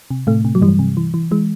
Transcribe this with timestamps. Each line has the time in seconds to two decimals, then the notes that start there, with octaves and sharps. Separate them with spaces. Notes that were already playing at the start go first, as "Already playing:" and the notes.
0.11 C3
0.27 A2 C3 A3
0.45 C3
0.55 F#3
0.62 G2 E3 G3
0.79 C3
0.97 E3
1.14 E3
1.31 E3 G#3